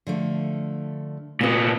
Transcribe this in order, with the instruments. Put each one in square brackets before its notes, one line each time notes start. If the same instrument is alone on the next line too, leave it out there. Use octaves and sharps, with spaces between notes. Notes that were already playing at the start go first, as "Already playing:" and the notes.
[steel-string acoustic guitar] D3 F3 A3
[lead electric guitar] A#2 B3 [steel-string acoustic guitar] F4 A4